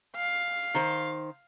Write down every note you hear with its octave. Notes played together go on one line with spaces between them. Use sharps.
F5
D#3 C5